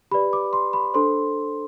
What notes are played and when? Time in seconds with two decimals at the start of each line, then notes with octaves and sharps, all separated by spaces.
0.11 G4 B4 D5 B5
0.33 D6
0.53 C6
0.73 B5
0.94 D4 A4 C5 C6